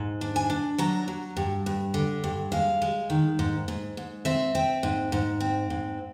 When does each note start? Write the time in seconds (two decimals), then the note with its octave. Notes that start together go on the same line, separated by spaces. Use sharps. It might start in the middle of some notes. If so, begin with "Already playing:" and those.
Already playing: G#2
0.21 D4
0.36 G#5
0.50 D4
0.78 F#3 A#5
1.08 F#3
1.37 G2
1.66 G2
1.94 D3
2.24 G2
2.52 G#3 F5
2.82 G#3
3.10 D#3
3.39 G#2
3.68 G#2
3.97 G#2
4.25 C4 E5
4.55 C4
4.83 G#2
5.12 G#2
5.40 C4
5.70 G#2